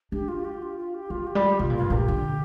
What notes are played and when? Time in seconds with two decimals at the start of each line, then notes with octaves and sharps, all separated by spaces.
0.12 D4 G4
0.28 F4
0.45 G4
0.62 F4
0.78 F4
0.94 G4
1.10 C4 F4
1.27 F3 G4
1.35 G3
1.44 G4
1.59 C3 F4
1.70 A#2
1.76 G2 F4
1.90 A#2 A#4
1.96 G4
2.08 D3